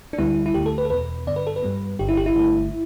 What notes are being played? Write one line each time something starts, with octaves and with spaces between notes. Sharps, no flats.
D4
D2 D3 G3 B3 E4
E4
D2 D3 A3 G4
A4
B4
A4
E2 B2 B3 B4
G2 D3 B3 D5
B4
A4
B4
G2 G3 B3
G1 G2 D3 G4
E4
G4
E4
G1 G2 D3 A3